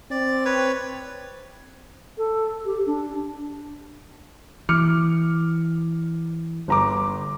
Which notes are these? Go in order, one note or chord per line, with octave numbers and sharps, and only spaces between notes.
C4 D5
B4 C#5
A4
G4
D4
E3 D6 F6 C#7
G1 A#5 D6